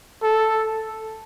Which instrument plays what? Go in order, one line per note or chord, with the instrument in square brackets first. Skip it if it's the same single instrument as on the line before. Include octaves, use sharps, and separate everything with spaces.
[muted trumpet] A4